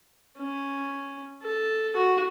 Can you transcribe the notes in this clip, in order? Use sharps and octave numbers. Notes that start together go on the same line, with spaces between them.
C#4
A4
F#4